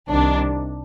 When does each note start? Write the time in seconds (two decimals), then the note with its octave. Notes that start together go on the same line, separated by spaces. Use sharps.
0.10 C2 C3 D#3 D4